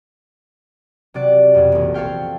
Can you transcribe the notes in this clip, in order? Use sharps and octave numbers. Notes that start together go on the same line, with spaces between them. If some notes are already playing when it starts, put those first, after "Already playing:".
C3 F#3 D5 F#6
F2 B2
E1 A#1
A4 C5 C#5 F5 G5